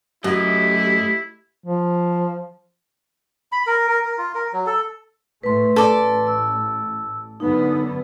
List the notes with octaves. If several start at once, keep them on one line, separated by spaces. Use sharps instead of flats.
F#2 A3 E4 G4 D#5
F3
B5
A#4
A#4
A#4
F4
A#4
F#3
A4
A2 A3 B4 C6
A1 A4 D5
E6
F#2 D3 B3 D#4